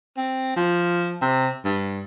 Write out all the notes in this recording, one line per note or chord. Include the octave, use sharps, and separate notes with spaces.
C4
F3
C3
G2